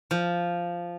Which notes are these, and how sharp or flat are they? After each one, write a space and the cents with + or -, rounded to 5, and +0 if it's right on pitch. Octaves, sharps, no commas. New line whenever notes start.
F3 -5